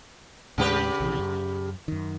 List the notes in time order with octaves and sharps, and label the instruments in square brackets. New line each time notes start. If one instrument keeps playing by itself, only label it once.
[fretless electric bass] D#2 A2 G#3 [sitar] C#3 G4 B4
[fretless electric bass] A#1 C3 E3
F#2
F#2 D#3